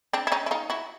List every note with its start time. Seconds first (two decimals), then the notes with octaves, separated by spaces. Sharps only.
0.13 C4 D4
0.27 E4
0.32 C#4 D#4
0.46 E4
0.51 D#4 F4
0.70 E4 F#4